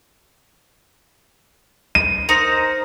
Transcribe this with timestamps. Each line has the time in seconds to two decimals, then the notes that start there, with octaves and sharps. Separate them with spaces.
1.95 D#7
2.29 D#4 A#4 C5